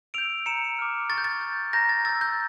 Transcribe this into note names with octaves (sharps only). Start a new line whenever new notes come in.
E6 G6 D7 F7
A#5 C#7 E7
D6 F6
C#6 A6
G6
A6
G6
A#5 G6 A#6
A6
E6 G6 A6
G6